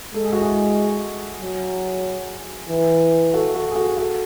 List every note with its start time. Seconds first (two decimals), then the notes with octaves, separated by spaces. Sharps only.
0.14 G#3 A4
0.24 G#4
0.33 F#4
0.42 E4 G#4
1.42 F#3
2.69 E3
3.34 F#4 A4
3.55 F#4 A4
3.71 G#4
3.76 F#4 A4
3.97 F#4 A4